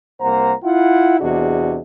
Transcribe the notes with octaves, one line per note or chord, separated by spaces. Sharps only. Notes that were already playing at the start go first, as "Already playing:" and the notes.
C2 A#3 C5 F#5 A#5
E4 F4 F#5
E2 C3 D4 F#4 G#4 D#5